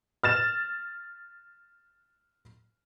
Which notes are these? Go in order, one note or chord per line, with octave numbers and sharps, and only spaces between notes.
F6 A6 E7